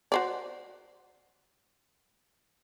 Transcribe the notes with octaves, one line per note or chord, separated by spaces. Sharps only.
F#4 C5 D5